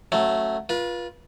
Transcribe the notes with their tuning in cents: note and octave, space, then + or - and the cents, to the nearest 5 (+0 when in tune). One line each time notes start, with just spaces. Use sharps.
F#3 +0 A3 +0 C#4 -25
F4 +0 B4 -35